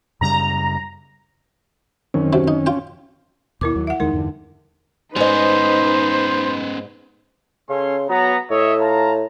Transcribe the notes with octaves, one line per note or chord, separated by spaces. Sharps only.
F#2 C#3 G3 A#5
F#2 D#3 C4 C#4
C3 F#3
D#4
F4 G5
D#2 B2 E4 A#4 D6
D#2 F#3
E5 F#5
E2 D#3 G#3 D#4 A#4
E2 G2 D3
G#2 B3 C#4 D#4 B4 C5 D#5
C#3 C#4 A4 C6
F#3 B3 A#5
A2 C#5 D#5 E5
F4 A5 A#5